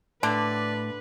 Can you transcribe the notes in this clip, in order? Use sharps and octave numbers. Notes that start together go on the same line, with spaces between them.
A2 D3 B4 D5 A5